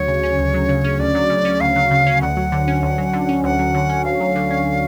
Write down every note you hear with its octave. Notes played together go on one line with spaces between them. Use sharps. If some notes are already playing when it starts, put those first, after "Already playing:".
Already playing: D2 F#3 C#5
C#3
C#4
D2
F#3
C#3
C#4
D2 D5
F#3
C#3
C#4
D2 F5
F#3
C#3
C#4
D2 F#5
F#3
D3
C#4
D2
F#3
D3
C#4
D2 F#5
F#3
D3
C#4
D2 F5
F#3
D3
C#4